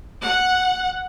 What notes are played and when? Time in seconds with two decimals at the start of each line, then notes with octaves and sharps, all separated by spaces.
0.22 F#5